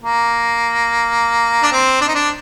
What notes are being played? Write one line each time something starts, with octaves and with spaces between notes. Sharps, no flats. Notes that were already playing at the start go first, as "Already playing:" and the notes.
A#3
D4
C4
D4
D#4
D4